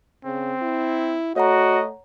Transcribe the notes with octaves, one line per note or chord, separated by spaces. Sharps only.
C#3 C4
E4
A3 F#4 C#5 D#5 F#5 A#5